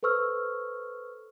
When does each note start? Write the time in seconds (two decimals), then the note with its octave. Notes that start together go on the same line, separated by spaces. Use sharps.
0.03 A4 B4 C5 C#6 E6 F6